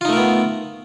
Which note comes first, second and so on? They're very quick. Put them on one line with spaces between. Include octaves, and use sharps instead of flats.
F4 D#4 A3 A#4 B3